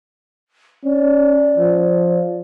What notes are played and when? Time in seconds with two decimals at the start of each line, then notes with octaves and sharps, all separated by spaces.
0.85 C#4 D5
1.58 F3